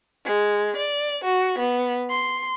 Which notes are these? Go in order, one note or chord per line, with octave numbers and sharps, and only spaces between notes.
G#3
D5
F#4
B3
C6